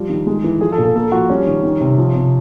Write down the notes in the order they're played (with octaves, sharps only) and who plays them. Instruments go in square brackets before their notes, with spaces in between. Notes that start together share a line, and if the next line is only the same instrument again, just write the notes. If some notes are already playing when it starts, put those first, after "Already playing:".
Already playing: [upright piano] F3 G3
D#3
G#3
E3
F3 G#4
A4
A#2
A4
A#3 A4
F3 F#4
G3 C#4
D#3
D#3
C3
F3
C3